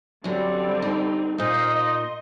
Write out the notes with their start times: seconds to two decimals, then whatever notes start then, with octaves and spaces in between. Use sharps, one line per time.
0.24 F#2 D3 F#3 G3 C4 D5
0.82 D#4
1.38 A#2 A#3 D#4 C5 D#5 F6
1.75 C6